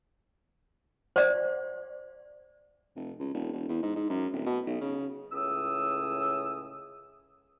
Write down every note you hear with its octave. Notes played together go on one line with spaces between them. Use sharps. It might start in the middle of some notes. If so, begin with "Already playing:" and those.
C5 D5
F1
C#2
E1
E1
E2
G#2
G#2
F#2
D1
B2
B1
C#3
C#2 A2 D#6 E6